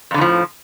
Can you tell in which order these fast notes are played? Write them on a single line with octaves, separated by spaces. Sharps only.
F2 D3 A2 F3